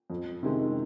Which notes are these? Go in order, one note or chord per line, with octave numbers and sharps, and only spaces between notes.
F2
C3 D#3 G#3